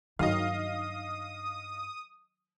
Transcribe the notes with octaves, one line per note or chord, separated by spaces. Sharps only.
G2 D#3 F#3 D#4 D#5 F5 D#6